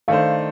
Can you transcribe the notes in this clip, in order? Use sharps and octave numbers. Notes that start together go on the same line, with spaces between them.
D#3 A3 D4 A4 C5 F5